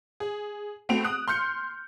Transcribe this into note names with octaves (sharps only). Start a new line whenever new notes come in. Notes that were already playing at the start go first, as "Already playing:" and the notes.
G#4
A3 B3 C4 F#4 D7 F7
D#6 F#6
C6 F6 G6 C#7